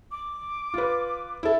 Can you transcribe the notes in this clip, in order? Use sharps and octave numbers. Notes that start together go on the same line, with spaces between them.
D6
F4 B4
E4 A4